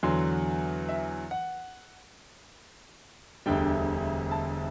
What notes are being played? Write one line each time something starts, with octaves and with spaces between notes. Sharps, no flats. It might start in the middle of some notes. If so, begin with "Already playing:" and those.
E2 D3 F#3 C6
E5
F#5
E1 D2 D3 G3 G5
A5